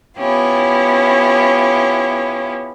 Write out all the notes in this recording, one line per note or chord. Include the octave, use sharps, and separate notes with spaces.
B3 C#4 E4 F4 G4